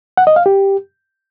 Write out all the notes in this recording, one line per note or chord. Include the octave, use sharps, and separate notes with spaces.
F#5
D#5
F5
G4